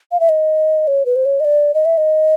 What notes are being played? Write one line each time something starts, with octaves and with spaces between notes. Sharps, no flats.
F5
E5
D#5
C#5
B4
C5
C#5
D#5
D5
D#5
E5
D#5